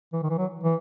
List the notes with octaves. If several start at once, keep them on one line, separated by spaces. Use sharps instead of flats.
E3
D#3
E3
F#3
E3